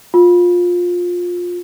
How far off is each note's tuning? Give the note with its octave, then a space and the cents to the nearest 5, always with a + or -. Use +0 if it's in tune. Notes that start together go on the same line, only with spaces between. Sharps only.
F4 +20